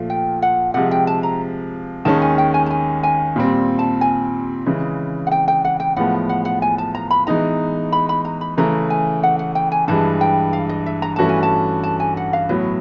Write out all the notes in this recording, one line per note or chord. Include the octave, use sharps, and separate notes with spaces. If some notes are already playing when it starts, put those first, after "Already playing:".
Already playing: A#2 F3 A3
G5
F#5
C3 F3 G#3 F#5
G5
A5
A#5
D#2 D#3 G#3 C#4 A5
G#5
G5
G#5
A5
G#5
G#5
A#2 G3 C4
A5
G#5
C#3 E3 G#3
F#5
G5
G5
F#5
G5
A2 F3 G#3 B3 F#5
F#5
F#5
G#5
A5
A#5
B5
E3 G#3 B3 D#4 A#5
B5
B5
A#5
B5
C#3 E3 A3 A#5
G#5
F#5
F#5
G5
G#5
G2 E3 G#3 A5
G5
F5
D#5
E5
A#5
G2 E3 A3 C#4 F#4 A5
G#5
A5
A5
G#5
F#5
F5
A2 F#3 B3 B4